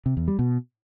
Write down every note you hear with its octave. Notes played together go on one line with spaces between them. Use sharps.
C3
E2
G3
B2